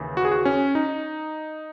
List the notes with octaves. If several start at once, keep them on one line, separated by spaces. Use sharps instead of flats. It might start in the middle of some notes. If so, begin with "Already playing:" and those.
Already playing: D#2 C#3 E3
F#4
G#4
F#4
C#4
D#4